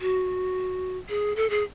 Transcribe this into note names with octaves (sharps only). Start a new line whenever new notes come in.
F#4
G#4
A4
G#4